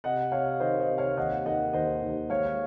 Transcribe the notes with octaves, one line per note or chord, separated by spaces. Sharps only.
C3 D#5 F#5
C3 C#5 F5
D#3 C5 D#5
C5 D#5
C3
C#5 F5
D#2 D#5 F#5
D#3 D#5 F#5
D#2 C5 D#5
D#2
G#3 C#5 F5